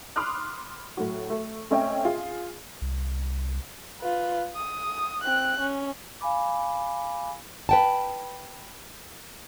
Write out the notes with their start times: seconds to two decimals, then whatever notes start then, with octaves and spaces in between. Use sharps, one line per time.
0.16 B5 C6 D6 D#6 F6 F#6
0.97 A2 F#3 F#4
1.30 A3
1.71 A3 C4 C#4 D#5 E5 G5
2.05 F4 G#4
2.82 C2
4.00 F4 B4
4.55 D#6
5.23 C4 F#6
5.60 C#4
6.21 F5 G#5 B5 D6
7.69 B4 G5 A5